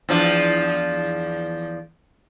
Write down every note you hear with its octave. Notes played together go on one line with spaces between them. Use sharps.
E2 F3 D4